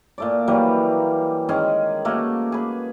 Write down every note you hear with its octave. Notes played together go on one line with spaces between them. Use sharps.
A#2 A3 D5
E3 F#3 G3 A#3
D#3 G#3 C#4 G#4
A3 A#3 F#4
G#4 B4